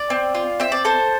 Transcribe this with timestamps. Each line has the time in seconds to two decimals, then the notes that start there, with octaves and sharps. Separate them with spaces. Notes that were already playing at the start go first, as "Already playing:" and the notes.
Already playing: D5
0.10 C4
0.35 F4
0.60 C4 E5
0.72 D5
0.85 A4 C5